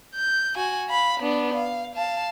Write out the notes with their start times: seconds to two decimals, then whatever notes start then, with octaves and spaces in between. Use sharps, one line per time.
0.15 G6
0.56 F#4 G#5
0.89 F5 B5
1.20 B3 D4
1.54 F5
1.95 F5 A5